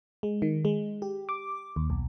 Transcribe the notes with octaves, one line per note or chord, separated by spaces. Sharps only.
G#3
D#3
G#3
G4
D6
D#2
B1